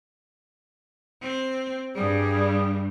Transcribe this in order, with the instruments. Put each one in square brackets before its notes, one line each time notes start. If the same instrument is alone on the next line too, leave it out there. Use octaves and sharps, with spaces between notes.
[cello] C4
[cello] G2 G3 [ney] G#4